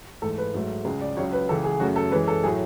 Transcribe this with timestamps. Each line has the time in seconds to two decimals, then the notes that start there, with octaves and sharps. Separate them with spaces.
0.22 G#2 E3 A3 A4
0.38 B4
0.54 G#2 F#3 A3
0.85 C#2 C#3 G#3
1.01 D5
1.17 C#2 C#3 F#3 C#5
1.33 B4
1.49 C#2 C#3 E3 A4
1.64 G#4
1.80 F#2 C#3 F#3 A3 F#4
1.96 A4
2.11 F#2 E3 G#3 B4
2.28 A4
2.43 A2 F#3 A3 G#4